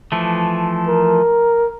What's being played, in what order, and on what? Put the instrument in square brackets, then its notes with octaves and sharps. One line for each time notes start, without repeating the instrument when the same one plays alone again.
[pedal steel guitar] E3 F3 A3
[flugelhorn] A#4